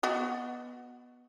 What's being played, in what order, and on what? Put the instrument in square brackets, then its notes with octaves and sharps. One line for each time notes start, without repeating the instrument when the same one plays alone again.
[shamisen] B3 F#4 D#5